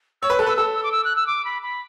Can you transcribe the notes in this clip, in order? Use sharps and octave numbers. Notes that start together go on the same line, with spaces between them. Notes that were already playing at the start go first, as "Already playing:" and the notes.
C#5 E6
B4
A4 F#6
B4 E6
A4 E6
E6
D6
E6
F#6
E6
D6
B5
B5